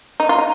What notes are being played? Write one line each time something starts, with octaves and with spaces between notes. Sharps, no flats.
D#4
F4
D#4